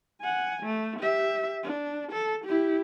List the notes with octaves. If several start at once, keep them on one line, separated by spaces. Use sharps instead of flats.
F#5 G#5
A3
G4 E5
D4
A4
E4 G4